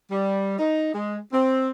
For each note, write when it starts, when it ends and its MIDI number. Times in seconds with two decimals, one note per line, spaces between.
0.11 0.55 55
0.59 0.91 63
0.94 1.17 56
1.32 1.69 60